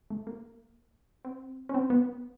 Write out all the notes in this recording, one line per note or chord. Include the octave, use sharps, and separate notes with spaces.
A3
A#3
C4
C#4
C4
B3